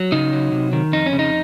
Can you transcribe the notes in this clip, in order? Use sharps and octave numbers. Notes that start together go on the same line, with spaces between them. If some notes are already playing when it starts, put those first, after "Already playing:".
Already playing: F#3
C#3 D#4
F#3
C3
D#3
F2 D#4
C#4
C#3
D#4